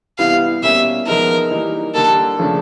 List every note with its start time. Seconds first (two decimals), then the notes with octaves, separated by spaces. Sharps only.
0.18 C3 E3 G3 B3 E4 F5
0.62 B2 G3 A#3 C#4 E5
1.07 F3 G#3 B3 D#4 A#4
1.50 E3 G3 A#3 D#4
1.94 D3 G3 A#3 A4
2.39 C#3 F3 A3 D4